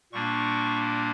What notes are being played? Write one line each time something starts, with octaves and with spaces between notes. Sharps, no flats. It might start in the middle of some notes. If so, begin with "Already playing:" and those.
A#2 G3 A#3 D4 C#6